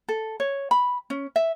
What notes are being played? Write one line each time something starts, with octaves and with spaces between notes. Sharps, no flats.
A4
C#5
B5
C#4
E5